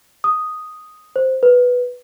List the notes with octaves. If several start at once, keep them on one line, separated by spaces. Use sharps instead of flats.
D#6
C5
B4